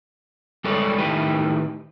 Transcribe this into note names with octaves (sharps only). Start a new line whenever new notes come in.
G3 G#3 A4 B4 C#5 D5
A2 D#3 G4 B4